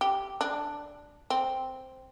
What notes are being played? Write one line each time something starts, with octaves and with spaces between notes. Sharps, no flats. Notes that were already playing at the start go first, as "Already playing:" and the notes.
G4
D4
C4